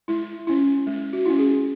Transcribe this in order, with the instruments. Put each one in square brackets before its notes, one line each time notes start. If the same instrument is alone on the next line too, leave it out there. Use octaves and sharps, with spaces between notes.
[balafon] G#3 E4
C#4 E4
G#3
F#4
C#4 E4
G#4